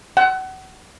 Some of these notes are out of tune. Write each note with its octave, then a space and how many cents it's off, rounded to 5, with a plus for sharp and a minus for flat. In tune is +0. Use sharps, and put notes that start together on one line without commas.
F#5 +30